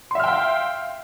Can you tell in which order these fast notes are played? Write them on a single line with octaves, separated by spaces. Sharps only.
C6 E5 F6 G5 F5